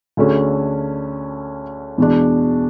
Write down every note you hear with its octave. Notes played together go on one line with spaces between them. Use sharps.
D2 D3 A3 C#4 G#4
E2 B2 G#3 D4